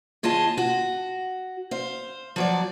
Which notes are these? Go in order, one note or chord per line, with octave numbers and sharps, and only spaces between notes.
D#2 F4 G#4 D#5 A5
F#4
C5 F5
F3 F#3 D5